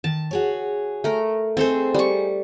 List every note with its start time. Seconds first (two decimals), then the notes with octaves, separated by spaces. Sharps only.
0.04 D#3 A5
0.31 F#4 G#4 C#5
1.04 A3 A#4
1.57 C4 D#4 G#4 A4 C5
1.94 G3 C#6